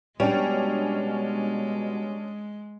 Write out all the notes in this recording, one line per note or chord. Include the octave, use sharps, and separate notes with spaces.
B2 G3 G#3 C#4 D4